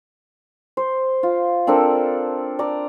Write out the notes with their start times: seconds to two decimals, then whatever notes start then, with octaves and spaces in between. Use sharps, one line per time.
0.77 C5
1.23 F4
1.67 C4 D4 A4 A#4
2.59 D5 A#5